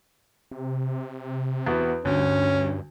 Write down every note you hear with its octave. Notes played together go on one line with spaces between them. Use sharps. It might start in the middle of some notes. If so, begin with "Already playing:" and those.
C3
E2 B3 F#4
D2 G2 C#4